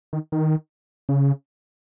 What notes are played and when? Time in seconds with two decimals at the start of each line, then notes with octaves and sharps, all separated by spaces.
0.13 D#3
0.32 D#3
1.09 C#3